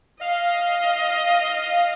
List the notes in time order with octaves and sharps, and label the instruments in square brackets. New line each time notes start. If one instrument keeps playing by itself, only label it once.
[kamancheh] D#5 [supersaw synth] F5